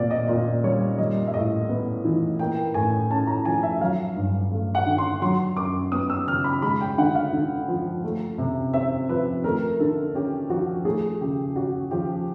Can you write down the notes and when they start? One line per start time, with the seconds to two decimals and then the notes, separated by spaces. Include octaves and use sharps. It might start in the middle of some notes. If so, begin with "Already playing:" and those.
Already playing: A#2 C4 C5 D5
0.10 D#5
0.28 A#2 D5
0.64 G3 C#5
0.98 G3 D#5
1.27 E5
1.34 A2 D#5
1.69 B3
2.05 E3
2.39 A#3 G5
2.74 A2 G#5
3.10 C#4 A5
3.27 A#5
3.45 F3 G#5
3.63 E5
3.80 F#3 F5
4.16 G2
4.51 A3
4.75 F#5
4.86 D3
4.98 C6
5.22 F#3 C6
5.57 F#2 D6
5.92 B3 D#6
6.10 E6
6.27 C#3 F6
6.44 B5
6.62 G#3 B5
6.81 G5
6.98 D3 F#5
7.15 F5
7.33 D3
7.68 F3
8.04 A3
8.38 C3
8.74 C4 E5
9.09 F3 B4
9.44 A3 A#4
9.80 D3 A4
10.15 C#4 G4
10.50 F3 F#4
10.85 A3 G#4
11.21 C#3 G4
11.56 C#4 F#4
11.91 F3 G4